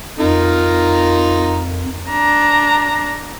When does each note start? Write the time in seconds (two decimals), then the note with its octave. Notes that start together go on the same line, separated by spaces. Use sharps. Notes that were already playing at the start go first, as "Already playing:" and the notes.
0.19 F2 D#4 F4 A#4
2.10 D4 A#5